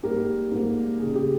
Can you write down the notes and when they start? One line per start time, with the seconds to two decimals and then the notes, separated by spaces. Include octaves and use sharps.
0.03 G#2 G3 A#3 G4 A#4
0.51 G#2 G3 A#3
1.00 C#2 C#3 G#3 G#4
1.15 G4